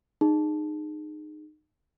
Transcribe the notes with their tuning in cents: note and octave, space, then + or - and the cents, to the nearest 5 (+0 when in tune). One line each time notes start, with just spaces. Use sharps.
D#4 -25 G#4 +0